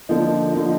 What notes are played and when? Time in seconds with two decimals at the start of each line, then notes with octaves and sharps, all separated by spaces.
0.09 D3 F3 A#3 D#4
0.53 D3 F3 A#3 D#4